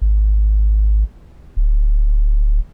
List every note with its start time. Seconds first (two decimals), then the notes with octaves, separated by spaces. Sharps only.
0.02 G#1
1.57 D1